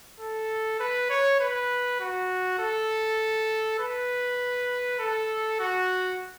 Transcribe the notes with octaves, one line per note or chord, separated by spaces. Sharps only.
A4
B4
C#5
B4
F#4
A4
B4
A4
F#4